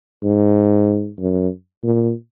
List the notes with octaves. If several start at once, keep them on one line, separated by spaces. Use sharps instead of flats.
G#2
F#2
A#2